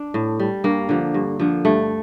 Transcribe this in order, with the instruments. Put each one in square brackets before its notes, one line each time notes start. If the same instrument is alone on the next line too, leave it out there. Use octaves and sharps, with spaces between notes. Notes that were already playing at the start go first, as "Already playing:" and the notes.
Already playing: [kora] D4
A2
G3
G2 A#3
D3 F3
G2
D3 F3
G2 A3